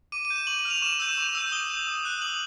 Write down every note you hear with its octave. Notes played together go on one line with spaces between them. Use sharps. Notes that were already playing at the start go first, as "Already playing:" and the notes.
D6 D#7
D#7
G6
E7
C#6 F#7
F#7
F6
F7
C#6 E7
E6 G6
E7
C#6 F7
E6 G6
D#6 G7
G6
D#6
F#6
D#6 F#7